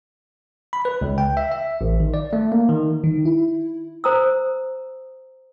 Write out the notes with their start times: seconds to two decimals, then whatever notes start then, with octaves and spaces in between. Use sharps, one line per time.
0.73 B5
0.85 B4
1.01 C#2
1.18 G5
1.37 E5
1.52 E5
1.81 A1
2.00 D#3
2.14 D5
2.33 A3
2.52 A#3
2.69 D#3
3.04 D#3
3.25 E4
4.04 C5 A#5 D#6 E6